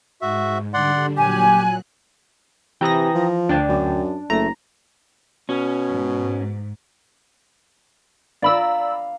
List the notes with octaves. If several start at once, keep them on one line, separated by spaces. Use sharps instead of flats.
G#2 F#4 E5
D3 G3 D4 D5 F#5 C6
A#2 F#3 G4 G#5 F#6
C3 E3 G5 A#5 D#6 A#6
F3
D2 D4 G5 A6
F#2
F#1 A3 A#5
B2 C#4
G#2
D5 F5 A#5 B5 D6 E6